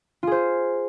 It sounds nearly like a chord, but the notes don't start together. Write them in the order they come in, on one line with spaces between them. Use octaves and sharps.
F4 G#4 C5